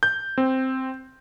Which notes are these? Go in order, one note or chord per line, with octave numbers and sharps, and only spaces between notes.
G6
C4